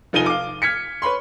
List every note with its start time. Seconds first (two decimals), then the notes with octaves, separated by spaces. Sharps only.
0.13 F1 F3 D#4 G#5 D#7 G7
0.26 F5 D6
0.62 F6 G#6 B6 C#7
1.02 B4 C#5 B5 C6